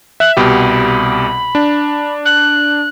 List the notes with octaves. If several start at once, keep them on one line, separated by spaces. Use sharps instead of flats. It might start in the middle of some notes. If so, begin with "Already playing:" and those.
E5 F#6
C2 B2 G4 B5
D4
F#6